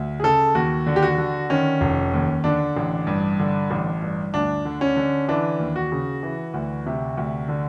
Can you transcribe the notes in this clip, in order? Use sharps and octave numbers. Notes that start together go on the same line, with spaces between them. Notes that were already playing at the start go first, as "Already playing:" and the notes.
Already playing: D2
G#4
C#3 A4
D#2 F#4
D3
G4
F#4
D3
D#3 C#4
F1
D#2
D3 D4
A1
G2
D3
A1
G2
D2 D4
D3
C#4
D3
E3 D4
D#2
F#4
C#3
E3
D2
C3
D2
D3